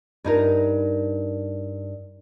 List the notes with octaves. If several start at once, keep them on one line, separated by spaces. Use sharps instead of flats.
G2 D#4 A#4